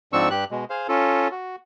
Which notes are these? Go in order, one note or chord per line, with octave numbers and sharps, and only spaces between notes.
G#2 F3 C4 D4 C#6 E6
G2 G4 F#6
B2 G#3
G#4 C5 F5
C#4 F4 A4
F#4